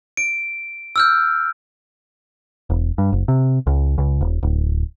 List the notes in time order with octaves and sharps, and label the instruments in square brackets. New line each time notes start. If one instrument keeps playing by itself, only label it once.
[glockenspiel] D7
E6 F6 G6
[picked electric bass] E1
G2
F#1
C3
C#2
C#2
D#1
D1